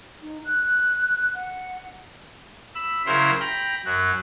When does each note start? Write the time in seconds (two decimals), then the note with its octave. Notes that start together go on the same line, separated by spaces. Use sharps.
0.23 D#4
0.45 F#6
1.34 F#5
2.75 B5 E6
3.06 C#3 F#3 E4 A#4 C5 C6
3.40 G5 A#5 B5
3.85 F#2 F#3 F#6